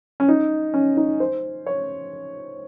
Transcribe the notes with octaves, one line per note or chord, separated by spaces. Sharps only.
C#4
D#4
C#4
D#4
C5
C#5